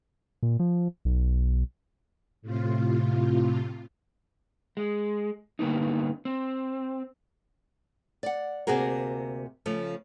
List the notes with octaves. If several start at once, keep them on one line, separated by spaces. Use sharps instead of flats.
A#2
F3
B1
A2 C3 F4
G#3
G2 D3 A#3 B3 D#4
C4
D5 F#5
D2 C3 A#3 F#4 G#4 A#4
C#3 F3 A3